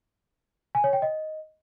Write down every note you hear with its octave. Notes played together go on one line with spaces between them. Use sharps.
G#5
C#5
G5
D#5